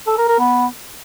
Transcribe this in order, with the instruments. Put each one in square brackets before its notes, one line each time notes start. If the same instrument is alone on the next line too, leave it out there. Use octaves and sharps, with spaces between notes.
[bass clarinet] A4
A#4
A#4
B3